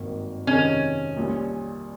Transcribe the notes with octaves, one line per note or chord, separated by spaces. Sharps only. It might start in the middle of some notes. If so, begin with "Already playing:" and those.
Already playing: G#1 G2 D#3 A#3
F2 C3 D#3 G#3 C#4 D#4
A#1 A#2 G3